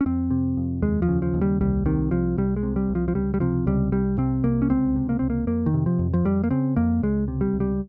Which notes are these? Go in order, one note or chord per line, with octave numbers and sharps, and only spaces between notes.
C#4
F2 C4
C3
F2
D#2 G#3
F3
C#3
F3
D#2
G3
C2 G3
C3 D#3
C2 F3
C2 G3
G#3
C3
G3
C2
F3
F3
C#2 G3
G3
C3 F3
C#2 G3
C2 G3
C3 C4
C2 A#3
C#4
C#2 C4
C3
A#3
C#2 C4
A#3
F2 A#3
D#3
C3
F3
F2
F3
F2 G3
A#3
C#3 C4
F2 A#3
C#2 G#3
C3
G3
C#2
G3